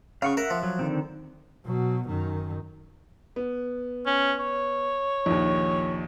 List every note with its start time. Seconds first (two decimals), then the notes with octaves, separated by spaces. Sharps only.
0.22 C#3 F5 F#5 C#6
0.37 A#4 E5 F#5
0.50 F3
0.63 F#3
0.79 D3 D#3 C4
1.65 B2 F#3
2.08 F#2 D#3
3.36 B3
4.06 C#4
4.40 C#5
5.26 A#1 D#2